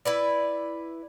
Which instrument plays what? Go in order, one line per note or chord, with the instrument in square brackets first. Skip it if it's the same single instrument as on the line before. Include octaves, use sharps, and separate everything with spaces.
[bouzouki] E4 B4 D5